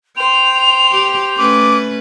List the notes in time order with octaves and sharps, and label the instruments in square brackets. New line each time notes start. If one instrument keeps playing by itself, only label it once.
[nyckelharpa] C5 G5 [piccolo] F7
[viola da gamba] G4
[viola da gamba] A3 C#4 B4 [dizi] D6